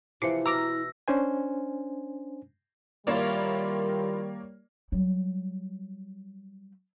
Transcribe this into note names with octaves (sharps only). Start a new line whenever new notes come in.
C3 E3 F3 E4 D6 C7 C#7
B2 A#5 D6 E6 F6 A#6
C#4 D4 C5 G#5
D#3 G3 A#3 E4 F4 C#5 D5
F#3 G3